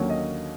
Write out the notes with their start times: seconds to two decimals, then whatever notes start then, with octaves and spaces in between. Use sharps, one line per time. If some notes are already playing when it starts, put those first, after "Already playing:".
Already playing: D#2 D3 F#3 A#3 C#4
0.10 D#5